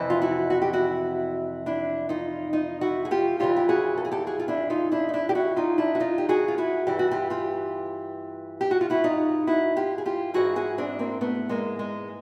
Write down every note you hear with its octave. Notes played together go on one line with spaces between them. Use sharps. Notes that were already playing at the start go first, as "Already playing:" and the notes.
Already playing: F2 C3 E3
F4
E4 F#4
F#4
G4
E4 F#4
D4 E4
D#4 F4
D#4 F4
E4 F#4
G#4
F4 G4
F2 C#3 E3 F4 G4
G4
F#4 G#4
A4
G#4
G4 A4
F#4 G#4
F4
D4 E4
D#4 F4
D4 E4
D#4
D4 E4
G4
E4 F#4
D#4 F4
D4 E4
F#4
D#4 F4
G4
F#4 G#4
F4
E4 F#4
G2 E3 G4
F#4
F4 G4
F4 G4
G4
F#4
F4
E4 F#4
D#4 F4
E4 F#4
F4 G4
G#4
F4 G4
G#2 E3 F#4 G#4
F#4 G#4
C4 D4
A#3 C4
A3 B3
G#3 A#3
G#3